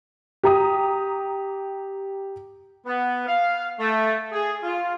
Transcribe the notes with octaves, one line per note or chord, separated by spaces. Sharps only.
G4 A#5 D#6
B3
F5
A3
G#4
F4